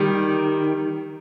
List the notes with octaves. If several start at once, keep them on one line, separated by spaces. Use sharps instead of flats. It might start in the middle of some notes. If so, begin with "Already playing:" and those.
Already playing: D#3 G3